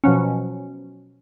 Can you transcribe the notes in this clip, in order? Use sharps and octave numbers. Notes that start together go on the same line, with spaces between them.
B2 F3 F#3 C#4